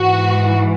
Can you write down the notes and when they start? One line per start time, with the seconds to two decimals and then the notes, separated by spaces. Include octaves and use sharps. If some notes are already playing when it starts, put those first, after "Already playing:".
Already playing: G#2 E3 F#4